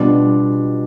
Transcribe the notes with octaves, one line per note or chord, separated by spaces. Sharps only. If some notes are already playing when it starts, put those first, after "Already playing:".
Already playing: B2 G3 B3 D4 F4